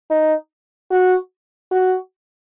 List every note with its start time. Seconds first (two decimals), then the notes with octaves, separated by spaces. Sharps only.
0.10 D#4
0.91 F#4
1.71 F#4